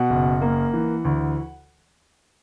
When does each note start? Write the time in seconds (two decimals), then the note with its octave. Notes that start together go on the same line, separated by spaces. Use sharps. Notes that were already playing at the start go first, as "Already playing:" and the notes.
Already playing: B2 F#5
0.10 F#1
0.41 A#3
0.73 E3
1.05 D2